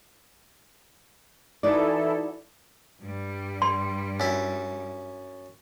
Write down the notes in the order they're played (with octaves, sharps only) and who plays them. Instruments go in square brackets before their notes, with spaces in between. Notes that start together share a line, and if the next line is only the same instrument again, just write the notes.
[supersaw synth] E3 E4 A4 [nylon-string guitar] D#4 F#4 D5
[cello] G2 G3
[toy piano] C6
[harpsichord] F#2 E4